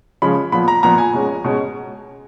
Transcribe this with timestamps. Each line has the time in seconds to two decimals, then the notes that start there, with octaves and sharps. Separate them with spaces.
0.22 C#3 F3 G#3 C#4 B5
0.52 A#2 F3 B3 B5
0.68 A#5
0.83 A#2 F3 B3 A#5
0.98 G#5
1.13 B2 G#3 C#4
1.44 B2 G#3 C#4